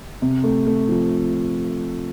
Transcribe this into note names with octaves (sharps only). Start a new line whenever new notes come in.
C3
A3
A3
F3